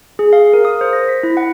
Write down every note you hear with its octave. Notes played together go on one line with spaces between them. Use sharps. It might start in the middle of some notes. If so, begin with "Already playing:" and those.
G#4
F5
A#4
D#6
C5
A#6
B6
E4
F#5